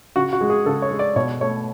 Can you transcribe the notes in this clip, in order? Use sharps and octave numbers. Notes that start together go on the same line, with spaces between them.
C#3 F#4
F#4
G#3
G#4
C#3 A4
C#5
G#3
D5
B2 C#5
A3 C#5